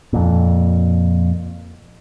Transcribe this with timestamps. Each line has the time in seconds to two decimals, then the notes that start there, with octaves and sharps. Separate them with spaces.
0.13 F2 A#2